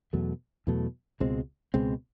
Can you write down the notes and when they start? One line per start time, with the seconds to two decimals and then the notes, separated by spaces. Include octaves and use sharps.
0.13 E2 B2 F#3 A3
0.67 E2 B2 F#3 A3
1.20 C#2 B2 G#3 C4
1.74 C#2 B2 G#3 C4